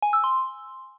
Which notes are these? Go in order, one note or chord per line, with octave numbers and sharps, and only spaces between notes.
G#5
E6
C6